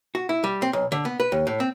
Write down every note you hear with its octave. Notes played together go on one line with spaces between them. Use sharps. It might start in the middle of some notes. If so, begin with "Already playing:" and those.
F#4
E4
G3
C4
B1
D3
B3
B4
D#2
A2
C4